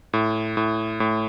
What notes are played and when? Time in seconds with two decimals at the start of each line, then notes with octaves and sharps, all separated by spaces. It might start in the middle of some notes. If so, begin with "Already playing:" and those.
0.13 A2
0.57 A2
1.00 A2